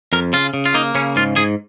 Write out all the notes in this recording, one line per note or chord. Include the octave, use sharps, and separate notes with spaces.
F2 A#4
C#3 F4
C#3
F4
A#3 D#4
C#3 C#4
G#2 F4
G#2 G#4